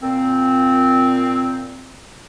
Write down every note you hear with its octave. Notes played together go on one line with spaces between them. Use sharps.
A#2 C4